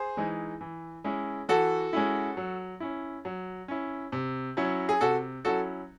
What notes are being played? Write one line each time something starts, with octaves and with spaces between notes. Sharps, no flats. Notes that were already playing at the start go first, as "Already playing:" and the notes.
Already playing: G#4 C5
E3 G#3 D#4
E3
G#3 C#4 E4
E3 F#4 A4
G#3 C#4 E4
F#3
C#4 E4
F#3
C#4 E4
C3
F#3 C#4 E4
G#4
C3 F#4 A4
F#3 C#4 E4 F#4 A4